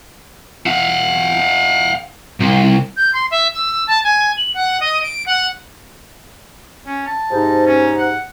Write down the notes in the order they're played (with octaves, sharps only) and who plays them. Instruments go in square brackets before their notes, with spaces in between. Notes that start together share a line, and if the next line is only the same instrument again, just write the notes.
[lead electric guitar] F5 F#5
C2
[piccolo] G6
C6
E5
E6
A5
G#5
F#7
F#5
D#5
D7
F#5
[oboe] C#4
A5
[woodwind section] G#2 C3 D#4
[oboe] C#4
F#5